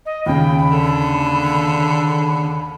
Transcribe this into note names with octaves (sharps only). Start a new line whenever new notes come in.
D#5
D#2 C#3 G5 B5
D3 A4